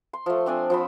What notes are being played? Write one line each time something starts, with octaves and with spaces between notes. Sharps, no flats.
C6
F3 A3
C4 D4 D5 G#5
F3 C5 B5